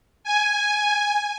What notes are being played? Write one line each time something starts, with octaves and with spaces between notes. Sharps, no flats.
G#5